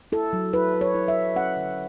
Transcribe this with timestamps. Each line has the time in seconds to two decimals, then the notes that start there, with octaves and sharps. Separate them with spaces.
0.12 E4 A4
0.33 F#3
0.53 E4 B4
0.74 E4
0.81 C#5
0.95 E4
1.08 E5
1.15 E4
1.36 C#4 F#5
1.57 D3